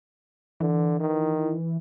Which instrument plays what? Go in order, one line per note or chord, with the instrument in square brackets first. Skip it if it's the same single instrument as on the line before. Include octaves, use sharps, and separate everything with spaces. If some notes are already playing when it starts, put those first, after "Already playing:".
[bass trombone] D3 [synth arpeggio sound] E3
[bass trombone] D#3